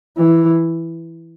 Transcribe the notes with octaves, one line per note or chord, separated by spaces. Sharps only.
E3